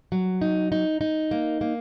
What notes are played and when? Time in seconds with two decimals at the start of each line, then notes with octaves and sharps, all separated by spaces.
0.12 F#3
0.41 D#4
0.72 D#4
1.01 D#4
1.31 A#3
1.61 A#3